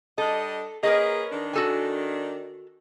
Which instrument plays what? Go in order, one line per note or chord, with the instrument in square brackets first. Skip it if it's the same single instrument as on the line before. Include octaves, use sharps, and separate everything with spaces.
[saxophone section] G3 D4 D#5 [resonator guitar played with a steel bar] A4
[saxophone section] A#3 C#4 G#4 [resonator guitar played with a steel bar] A#4 B4 D#5
[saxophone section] D#3 D4
[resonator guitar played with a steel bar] F#4 A4 G#5